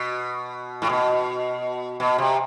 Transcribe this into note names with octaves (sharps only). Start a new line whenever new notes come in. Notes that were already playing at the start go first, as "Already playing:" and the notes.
Already playing: B2
A2
B2
B2
C3